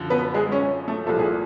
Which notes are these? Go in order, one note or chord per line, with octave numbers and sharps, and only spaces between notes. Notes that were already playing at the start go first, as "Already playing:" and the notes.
Already playing: F#2 D3 F3
B3 B4
G#3 G#4
C#4 C#5
A3 A4
C2 A#2 F3 A4
G#4